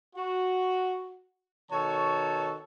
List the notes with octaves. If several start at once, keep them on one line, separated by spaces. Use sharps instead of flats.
F#4
B2 D#3 F#4 A4 C#5 A5